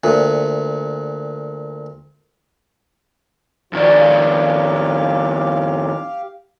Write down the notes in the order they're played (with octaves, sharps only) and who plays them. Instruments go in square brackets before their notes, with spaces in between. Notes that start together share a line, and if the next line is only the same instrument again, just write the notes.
[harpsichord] D2 A#2
[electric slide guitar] F2 D#3 D5 [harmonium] F3 F#4
[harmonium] G4 F5